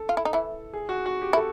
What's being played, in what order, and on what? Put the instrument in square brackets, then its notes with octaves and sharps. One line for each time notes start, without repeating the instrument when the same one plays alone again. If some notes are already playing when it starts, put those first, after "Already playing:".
Already playing: [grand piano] A4
[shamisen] F4
E4
D#4
E3 E4
[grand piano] G#4
F#4
F#4
G4
[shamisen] E4
[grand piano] A4